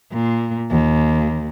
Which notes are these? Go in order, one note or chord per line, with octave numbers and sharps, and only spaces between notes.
A#2
D#2